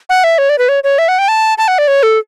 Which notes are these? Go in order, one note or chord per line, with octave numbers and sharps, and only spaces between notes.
F#5
E5
C#5
D5
B4
C#5
C#5
E5
F#5
G5
A5
A5
F#5
D5
C#5
A4